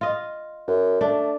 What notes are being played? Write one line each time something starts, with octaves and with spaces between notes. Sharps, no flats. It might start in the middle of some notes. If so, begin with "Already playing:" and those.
F4 D#5
F#2
A3 D4